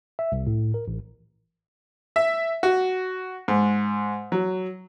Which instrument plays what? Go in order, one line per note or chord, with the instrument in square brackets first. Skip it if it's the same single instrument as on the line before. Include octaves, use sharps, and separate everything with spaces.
[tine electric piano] E5
C2
A2
A#4
A1
[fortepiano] E5
F#4
G#2
F#3